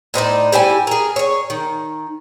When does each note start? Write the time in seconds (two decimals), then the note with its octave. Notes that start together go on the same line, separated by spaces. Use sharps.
0.14 A2 D#4 C5 D5
0.52 G3 E4 G4 G#5
0.87 G#4 A#4
1.16 G#4 C#5
1.50 D#3